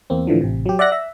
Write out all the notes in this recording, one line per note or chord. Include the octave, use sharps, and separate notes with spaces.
E2 A#3 C4
A2 D3 E3 F3
A1 C3
F#3 G4
D5 E5 F#5 F#6 A#6
E5